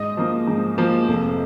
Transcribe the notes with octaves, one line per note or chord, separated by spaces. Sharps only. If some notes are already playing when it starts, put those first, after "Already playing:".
Already playing: G#2 D#5 D#6
F3 A#3
G#2
F3 A#3
F1